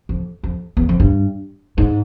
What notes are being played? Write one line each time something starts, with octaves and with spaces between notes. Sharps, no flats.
F2
F2
E2
F2
G2
G#2